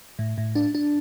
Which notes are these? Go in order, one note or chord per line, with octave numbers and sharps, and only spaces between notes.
A2
A2
D4
D4